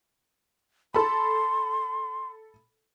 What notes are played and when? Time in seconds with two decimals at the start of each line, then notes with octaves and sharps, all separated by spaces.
0.94 A4 B5 C6